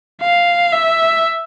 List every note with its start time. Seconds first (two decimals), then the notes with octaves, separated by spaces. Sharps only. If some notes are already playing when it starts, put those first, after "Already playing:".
0.22 F5
0.72 E5